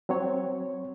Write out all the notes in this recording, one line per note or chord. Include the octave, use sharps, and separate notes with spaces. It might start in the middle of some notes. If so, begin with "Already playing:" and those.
F#3 C4 C#5